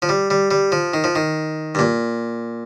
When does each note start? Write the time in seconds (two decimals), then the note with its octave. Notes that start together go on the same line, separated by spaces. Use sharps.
0.02 F3
0.09 G3
0.30 G3
0.51 G3
0.72 F3
0.94 D#3
1.04 F3
1.15 D#3
1.75 G2
1.79 A#2